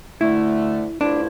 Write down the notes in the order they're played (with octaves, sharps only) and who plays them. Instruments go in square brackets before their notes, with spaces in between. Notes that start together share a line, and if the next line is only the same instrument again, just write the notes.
[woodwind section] D2 D3 A3 [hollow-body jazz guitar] E4
[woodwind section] G2 D3 F3 A3 E4 [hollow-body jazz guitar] D4